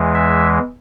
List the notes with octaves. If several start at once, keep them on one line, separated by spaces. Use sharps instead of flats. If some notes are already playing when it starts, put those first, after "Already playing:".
Already playing: E2 E3 G#3
E5